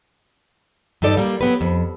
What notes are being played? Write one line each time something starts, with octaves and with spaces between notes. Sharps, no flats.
G2 G3 D#4 A4 D5
G3 A#3
F#3 B3 G4 B4
F2